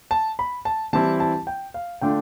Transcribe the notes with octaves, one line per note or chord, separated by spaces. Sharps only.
A5
B5
A5
E3 G3 C4 E4 A5
A5
G5
F5
D3 A3 D4 F4 G5